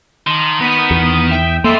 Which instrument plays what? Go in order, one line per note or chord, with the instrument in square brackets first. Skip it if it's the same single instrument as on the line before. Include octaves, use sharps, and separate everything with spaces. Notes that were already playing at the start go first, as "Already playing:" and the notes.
[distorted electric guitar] D#3 [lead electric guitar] A5 C6
[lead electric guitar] B3 [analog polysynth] D#6 B6 D#7
[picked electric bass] E2
[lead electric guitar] E5 [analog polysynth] G5
[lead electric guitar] F2 G#3 [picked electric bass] A#3 [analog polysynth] A4 E5 C6